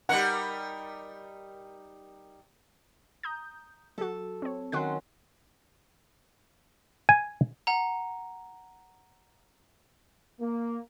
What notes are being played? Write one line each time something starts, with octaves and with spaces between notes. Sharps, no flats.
G3 D#4 A#4 F#5
A#5 D#6 G6
F#3 F#4 A4 A5
C4 C#5
D#3 F#3 C#4 F#5 C6 F#6
G#5
F#5 A#5
A#3